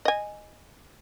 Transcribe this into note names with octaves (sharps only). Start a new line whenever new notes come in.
D#5 G#5